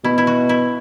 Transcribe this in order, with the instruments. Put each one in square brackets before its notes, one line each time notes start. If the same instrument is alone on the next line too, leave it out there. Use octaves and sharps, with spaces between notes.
[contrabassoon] B2 [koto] E4
[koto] E4
F#4
E4